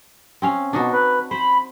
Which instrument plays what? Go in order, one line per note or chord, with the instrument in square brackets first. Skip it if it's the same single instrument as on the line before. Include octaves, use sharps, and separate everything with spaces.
[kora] C4 C#4 F5
[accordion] B2 [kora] D4 D#4 F#4
[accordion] B4
[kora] C5 [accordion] B5